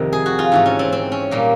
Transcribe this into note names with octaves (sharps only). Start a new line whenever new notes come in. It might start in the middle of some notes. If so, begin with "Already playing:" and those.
Already playing: F2 C3 D#3
G#4
F#4
F4
G#2 E3 A3
C#4
C4
C4
C#4
A#2 G3 A#3